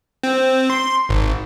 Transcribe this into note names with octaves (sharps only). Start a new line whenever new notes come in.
C4
C6
G#1